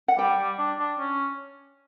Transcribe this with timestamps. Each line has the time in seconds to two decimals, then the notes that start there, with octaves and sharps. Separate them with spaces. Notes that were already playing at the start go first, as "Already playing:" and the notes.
0.08 F#5
0.18 G3 G5
0.38 G3
0.59 D4
0.79 D4
0.99 C#4